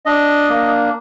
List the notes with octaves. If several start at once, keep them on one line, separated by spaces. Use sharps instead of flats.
D4 D#5
A#3